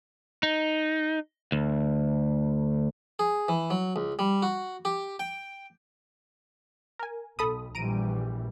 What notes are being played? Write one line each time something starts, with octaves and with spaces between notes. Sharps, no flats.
D#4
D2
G#4
E3
F#3
C#2
G3
F#4
G4
G5
A#4 G#5
B1 A4 B5 D#6
A#1 E3 G3 A#5 D7 D#7